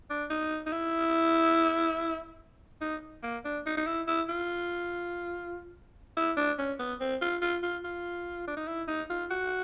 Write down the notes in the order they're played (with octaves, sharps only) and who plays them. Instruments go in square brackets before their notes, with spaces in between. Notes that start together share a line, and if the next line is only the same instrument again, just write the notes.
[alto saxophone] D4
D#4
D#4
E4
D#4
A#3
D4
D#4
D#4
E4
E4
F4
E4
D4
C#4
B3
C4
F4
F4
F4
F4
D4
D#4
E4
D#4
F4
F#4